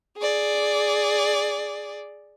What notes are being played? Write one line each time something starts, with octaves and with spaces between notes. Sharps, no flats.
G#4 D5